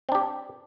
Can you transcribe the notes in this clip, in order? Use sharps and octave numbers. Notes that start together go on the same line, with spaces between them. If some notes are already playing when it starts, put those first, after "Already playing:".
C4 D4 G4